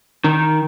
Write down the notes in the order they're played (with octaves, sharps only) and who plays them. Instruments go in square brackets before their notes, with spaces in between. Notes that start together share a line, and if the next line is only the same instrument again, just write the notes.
[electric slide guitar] D#3